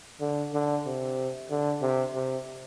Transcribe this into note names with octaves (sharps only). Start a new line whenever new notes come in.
D3
D3
C3
D3
C3
C3